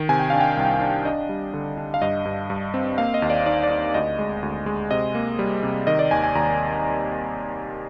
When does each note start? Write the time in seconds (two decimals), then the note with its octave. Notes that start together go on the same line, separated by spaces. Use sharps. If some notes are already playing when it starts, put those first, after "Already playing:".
Already playing: D#3
0.09 C3 G#5
0.19 G5
0.30 D4 F5
0.41 G5
0.57 C2
0.81 D4
1.05 D4 D#5
1.29 G3
1.54 D3
1.77 D4
1.94 F5
2.02 G2 D#5
2.25 G2
2.50 G2
2.74 C4
2.98 A#3 F5
3.14 D#5
3.22 D#2
3.30 D5
3.46 D#4 D5
3.63 D5
3.71 D#4
3.94 D2 D#5
4.19 G#3
4.43 D2
4.66 G#3
4.91 C3 D#5
5.15 A#3
5.39 G3
5.63 C3
5.87 D#3 D#5
5.99 D5
6.11 D#2 G#5
6.24 G#5
6.35 D#2 A#5